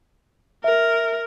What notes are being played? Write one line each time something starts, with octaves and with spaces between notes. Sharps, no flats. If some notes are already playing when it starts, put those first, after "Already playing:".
A#4 E5